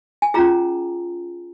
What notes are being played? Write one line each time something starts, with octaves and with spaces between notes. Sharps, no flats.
G#5
C#4 F4 G#4 A#5